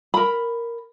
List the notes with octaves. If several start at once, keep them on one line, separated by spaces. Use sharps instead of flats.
A#4 B5